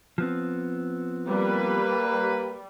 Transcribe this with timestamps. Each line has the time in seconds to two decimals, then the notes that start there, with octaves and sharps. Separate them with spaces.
0.18 F3 B3 C4
1.28 G3 A#3 B4